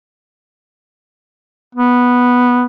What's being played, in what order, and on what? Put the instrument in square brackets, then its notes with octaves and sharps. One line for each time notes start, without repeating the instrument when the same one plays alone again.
[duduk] B3